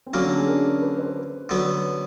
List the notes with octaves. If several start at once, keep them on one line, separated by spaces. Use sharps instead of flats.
C4
D3 F#3 A#3 C#4
D4
G#4
A#4
B4
C5
D3 F#3 B3